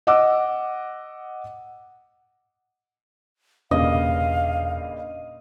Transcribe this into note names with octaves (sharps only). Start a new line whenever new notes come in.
D#5 F#5 D6 E6
E1 G2 A#2 C#3 D#5 F5